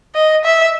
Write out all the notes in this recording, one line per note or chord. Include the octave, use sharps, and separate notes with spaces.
D#5
E5